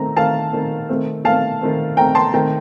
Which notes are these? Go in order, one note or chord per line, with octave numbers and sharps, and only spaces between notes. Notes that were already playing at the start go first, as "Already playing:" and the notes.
Already playing: D#3 A3 C4 A#5
D#3 A3 C4 F5 A5
D#3 A3 C4
D#3 A3 C4
D#3 A3 C4 F5 A5
D#3 A3 C4
D#3 A3 C4 G5 A#5
A5 C6
D#3 A3 C4 G5 A#5